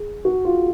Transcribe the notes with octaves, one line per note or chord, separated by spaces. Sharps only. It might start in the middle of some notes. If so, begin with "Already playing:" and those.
Already playing: G#4
F#4
F4